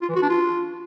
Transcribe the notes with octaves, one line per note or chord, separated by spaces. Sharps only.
F4
E3
F#4
D4
F4